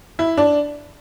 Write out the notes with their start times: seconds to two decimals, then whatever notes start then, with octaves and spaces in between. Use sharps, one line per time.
0.19 E4
0.37 D4